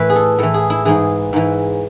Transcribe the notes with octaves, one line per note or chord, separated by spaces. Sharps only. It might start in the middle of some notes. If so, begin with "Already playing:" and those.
Already playing: A2 E3 B4
G#4
A4
A2 E3 A4
G#4
E4
G#2 E3 G#4
G#2 E3